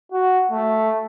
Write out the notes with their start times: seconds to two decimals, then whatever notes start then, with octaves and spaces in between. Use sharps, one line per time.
0.12 F#4
0.51 A3